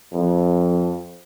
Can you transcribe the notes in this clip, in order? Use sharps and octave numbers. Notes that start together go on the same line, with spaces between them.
F2